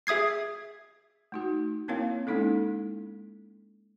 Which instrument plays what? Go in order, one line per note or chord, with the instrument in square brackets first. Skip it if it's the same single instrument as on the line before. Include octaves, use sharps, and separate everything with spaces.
[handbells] G#4 E5 D#6 G#6 C7
[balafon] A3 D#4 F#4
A#3 C4 E4 A#4 C#5 F5
G#3 A#3 C#4 D#4 E4 A4